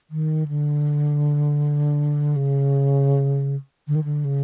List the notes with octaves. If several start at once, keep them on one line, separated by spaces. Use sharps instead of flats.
D#3
D3
C#3
D3
D#3
D3
C#3